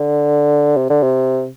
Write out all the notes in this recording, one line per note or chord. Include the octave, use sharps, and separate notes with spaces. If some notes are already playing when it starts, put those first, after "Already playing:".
Already playing: D3
C3
D3
C3